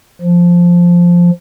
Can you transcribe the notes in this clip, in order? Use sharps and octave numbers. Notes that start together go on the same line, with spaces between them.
F3